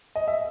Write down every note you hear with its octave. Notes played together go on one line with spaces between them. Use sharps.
D#5
E5